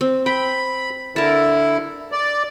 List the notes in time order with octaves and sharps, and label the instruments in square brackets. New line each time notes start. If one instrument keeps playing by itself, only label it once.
[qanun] C4
[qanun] G5 [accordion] B5
[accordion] D3 E4 [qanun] A#4 A5
[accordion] D5